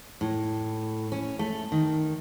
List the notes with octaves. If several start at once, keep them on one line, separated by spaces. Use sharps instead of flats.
A2
C#4
A3
D#3